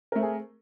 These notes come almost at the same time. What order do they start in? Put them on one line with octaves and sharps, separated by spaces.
A#4 A3 C4 G#4